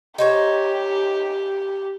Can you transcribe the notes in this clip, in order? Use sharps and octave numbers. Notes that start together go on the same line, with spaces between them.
D#4 G4 C5 C#5